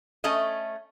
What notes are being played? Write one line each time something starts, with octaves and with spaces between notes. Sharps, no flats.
A3 C#4 D#5